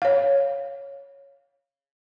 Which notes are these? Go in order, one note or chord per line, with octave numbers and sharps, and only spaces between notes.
C#5 F5